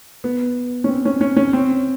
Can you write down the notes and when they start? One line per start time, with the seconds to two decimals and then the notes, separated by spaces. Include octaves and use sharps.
0.24 B3
0.84 C#4
0.89 C4
1.05 C#4
1.21 C#4
1.37 C#4
1.53 C4